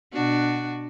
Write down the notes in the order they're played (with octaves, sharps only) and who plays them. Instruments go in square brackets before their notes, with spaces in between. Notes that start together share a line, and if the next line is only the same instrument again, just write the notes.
[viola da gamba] B2 D4 F#4